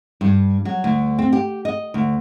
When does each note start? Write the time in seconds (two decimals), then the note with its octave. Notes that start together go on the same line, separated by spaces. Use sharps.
0.21 G2
0.65 F#3
0.84 D2
1.19 C4
1.33 G4
1.65 D#5
1.94 D2